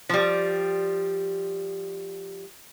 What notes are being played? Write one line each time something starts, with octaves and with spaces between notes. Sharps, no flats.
F3 G3